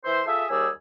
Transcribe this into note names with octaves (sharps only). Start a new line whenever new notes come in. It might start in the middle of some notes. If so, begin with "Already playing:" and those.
E3 E4 C5
F4 G#4 A4 E5
D#2 G3 G#4 G#5 E6